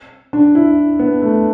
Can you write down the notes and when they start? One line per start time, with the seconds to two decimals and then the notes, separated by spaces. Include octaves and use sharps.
0.33 D4
0.55 E4
0.99 B3
1.22 A3